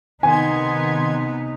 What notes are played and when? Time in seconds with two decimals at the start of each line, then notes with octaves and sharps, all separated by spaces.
0.23 C3 D#3 B3 D#4 G#5 C6 G#6